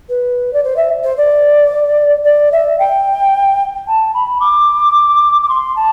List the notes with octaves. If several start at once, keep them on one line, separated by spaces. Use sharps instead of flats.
B4
D5
C5
E5
C5
D5
D5
E5
G5
A5
B5
D6
D6
C6
A5